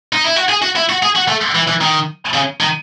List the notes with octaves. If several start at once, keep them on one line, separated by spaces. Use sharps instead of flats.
D#4
E4
F#4
G#4
F#4
E4
F#4
G#4
F#4
A3
E3
E3
D#3
C#3
D#3